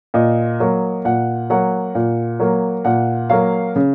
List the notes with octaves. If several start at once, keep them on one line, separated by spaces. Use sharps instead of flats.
A#2 D#5
F#3 A#3
A#2 F#5
F#3 A#3 F#5
A#2
F#3 A#3
A#2 F#5
F#3 A#3 F5
C#3